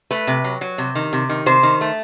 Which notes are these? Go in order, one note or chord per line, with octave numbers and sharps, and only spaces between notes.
A3 B4
C3
F#3
F#3
C3
D#3
C3
D#3
C3 C5
D#3
A3